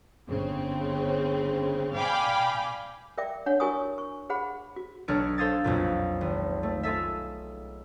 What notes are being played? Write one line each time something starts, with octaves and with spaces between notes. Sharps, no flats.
G1 C#3 C4
D5 F5 G5 G#5 B5 D6
A#4 D5 E5 G5 D6
D4 C#5 F#5
E4 F#4 A#4 G#5 C#6 D#6
C#6
G#4 C5 F#5 B5
F#4
B1 D4 A4 C#5 F6 D7
A4 C5 F5 D#6 G#6 A6
B1 F2 A#2
G#1
A3
F4 G#4 A4 E5